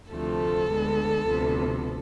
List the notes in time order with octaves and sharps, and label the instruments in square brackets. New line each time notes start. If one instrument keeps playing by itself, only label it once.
[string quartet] D2 C3 F3 A3 A4
D2 D3 G#3 B3
D2 C3 F3 B3